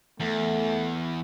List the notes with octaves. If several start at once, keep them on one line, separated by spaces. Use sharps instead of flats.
E2 A3